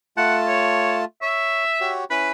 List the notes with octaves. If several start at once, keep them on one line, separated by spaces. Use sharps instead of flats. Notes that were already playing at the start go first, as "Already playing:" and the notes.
A3 F4 F#5 A5
C#5
C#5 E5 C#6
F#4 G4 C#5
C#4 E4 B4 B5